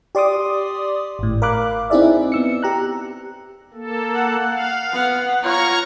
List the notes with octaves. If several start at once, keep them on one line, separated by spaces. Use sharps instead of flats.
G4 D5 C6 D6 D#6
G#1 A2
A#4 F5 B5 D6 F#6
C4 D#4 E4 G#4 D5 E5
B3 E6 C#7
G4 A#5 F#6
A#3 A4
F#5
F5
B3 F#5
F4 C#5 A#5 C#6 F6